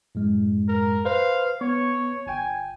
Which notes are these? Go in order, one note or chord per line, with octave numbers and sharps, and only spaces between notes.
F#2 A2 G#3
A#4
B4 C5 F5
B3 C#5 C#6
G1 G5 G#5